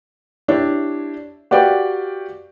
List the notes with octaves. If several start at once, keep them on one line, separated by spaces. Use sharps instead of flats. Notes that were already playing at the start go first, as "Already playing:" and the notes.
D4 E4 G4 C#5 E5
F#4 G4 B4 D5 F5 G5